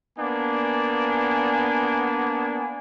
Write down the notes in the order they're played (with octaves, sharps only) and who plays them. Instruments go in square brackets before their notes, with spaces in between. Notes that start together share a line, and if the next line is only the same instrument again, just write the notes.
[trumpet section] A#3 B3 D4 G#5